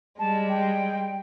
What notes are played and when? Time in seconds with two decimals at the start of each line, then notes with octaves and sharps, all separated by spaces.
0.19 G3 G#3 A5
0.49 G5